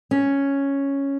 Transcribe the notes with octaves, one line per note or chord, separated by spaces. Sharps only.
C#4